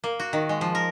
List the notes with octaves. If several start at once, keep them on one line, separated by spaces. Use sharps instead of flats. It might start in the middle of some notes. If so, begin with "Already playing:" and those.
A#3
F#4
D#3
G#3
F3
A#4